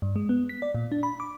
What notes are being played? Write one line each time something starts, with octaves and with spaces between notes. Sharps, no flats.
G2
G#3
B3
B6
D5
A#2
D4
B5
D6